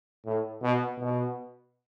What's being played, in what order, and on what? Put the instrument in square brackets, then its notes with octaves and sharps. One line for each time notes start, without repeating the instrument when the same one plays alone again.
[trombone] A2
B2
B2